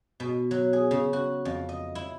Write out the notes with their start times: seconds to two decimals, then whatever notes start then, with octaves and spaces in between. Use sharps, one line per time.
0.20 B2
0.51 F#3
0.73 G#4
0.91 C#3
1.13 F#4
1.45 F2
1.69 D#5
1.95 E4